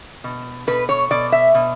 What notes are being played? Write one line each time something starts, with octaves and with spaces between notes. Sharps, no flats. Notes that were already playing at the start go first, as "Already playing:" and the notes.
B2
B2 B4
C#5
B2 D5
E5
B2